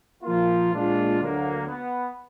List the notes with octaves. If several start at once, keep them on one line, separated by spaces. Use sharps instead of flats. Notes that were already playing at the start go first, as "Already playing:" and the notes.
A#2 F3 A#3 F4
A#2 G#3 D4 F4
D2 D3 F#3 A#3
B3